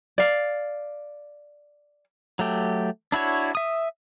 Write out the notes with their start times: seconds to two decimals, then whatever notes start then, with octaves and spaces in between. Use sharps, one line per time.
0.18 D5 F5
2.39 F#3 A3 G4
3.12 D4 E4 F#4 C#5
3.55 E5 D#6